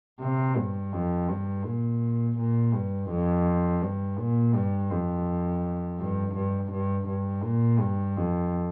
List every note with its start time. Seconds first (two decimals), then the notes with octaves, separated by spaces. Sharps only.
0.21 C3
0.57 G2
0.93 F2
1.29 G2
1.65 A#2
2.38 A#2
2.74 G2
3.10 F2
3.82 G2
4.18 A#2
4.54 G2
4.91 F2
5.99 G2
6.35 G2
6.71 G2
7.07 G2
7.43 A#2
7.79 G2
8.16 F2